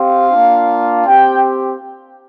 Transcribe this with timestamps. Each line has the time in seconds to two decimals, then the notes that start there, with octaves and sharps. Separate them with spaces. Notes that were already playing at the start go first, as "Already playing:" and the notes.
Already playing: C4 G4 F5
0.29 A#3 D4 F4
1.05 C4 G4 G5